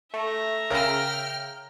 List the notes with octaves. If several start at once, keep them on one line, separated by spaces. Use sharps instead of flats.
A3 E5 A#5
C#3 A#4 G5 F6